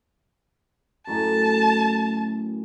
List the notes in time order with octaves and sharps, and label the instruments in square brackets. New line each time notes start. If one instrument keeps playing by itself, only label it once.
[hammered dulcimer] F#2 A2 G#5 [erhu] A5